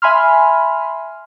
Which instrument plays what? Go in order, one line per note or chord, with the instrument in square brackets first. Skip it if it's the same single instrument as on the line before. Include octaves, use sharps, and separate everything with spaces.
[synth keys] E5 G#5 B5 C6 F6